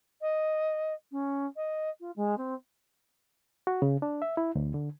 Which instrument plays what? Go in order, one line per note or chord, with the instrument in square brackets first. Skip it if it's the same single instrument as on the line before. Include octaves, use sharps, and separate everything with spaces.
[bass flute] D#5
C#4
D#5
F4
G#3
C4
[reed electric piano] F#4
C#3
D4
E5
E4
D2
D3